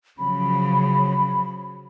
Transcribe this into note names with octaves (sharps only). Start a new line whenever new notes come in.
C#3 F3 F#3 B5